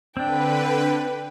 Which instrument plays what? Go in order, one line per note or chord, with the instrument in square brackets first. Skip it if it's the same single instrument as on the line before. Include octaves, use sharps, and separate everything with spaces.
[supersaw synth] D3 B4 [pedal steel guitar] C4 D4 [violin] G5